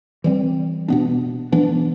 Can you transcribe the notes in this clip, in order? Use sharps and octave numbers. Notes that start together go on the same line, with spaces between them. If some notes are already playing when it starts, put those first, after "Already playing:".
E3 G3 C4
B2 B3 D4
E3 B3 D4